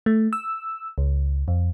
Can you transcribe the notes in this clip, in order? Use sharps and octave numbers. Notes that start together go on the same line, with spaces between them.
A3
E6
C#2
F2